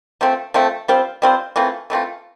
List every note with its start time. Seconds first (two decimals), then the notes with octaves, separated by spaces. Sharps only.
0.21 F3 A3 C4
0.54 F3 A3 C4
0.88 G3 C4 F4 C5
1.22 G3 C4 F4 C5
1.56 E3 A3 C4 F4
1.90 E3 A3 C4 F4